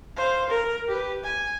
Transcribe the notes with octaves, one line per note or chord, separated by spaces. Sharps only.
C5 F5
A#4
G4 B4
G#5